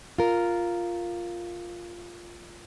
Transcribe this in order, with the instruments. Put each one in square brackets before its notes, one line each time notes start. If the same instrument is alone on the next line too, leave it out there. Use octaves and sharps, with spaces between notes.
[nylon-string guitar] F4 A#4